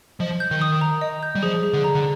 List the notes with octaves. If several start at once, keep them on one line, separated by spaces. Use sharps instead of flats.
F3 D#5
G6
D#3
D#6
A#5
D#5
G6
G3
F3 G#4
G#4
D3
A#5
D3